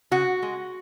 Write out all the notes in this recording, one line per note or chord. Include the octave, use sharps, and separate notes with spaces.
C#3 F#4
G#3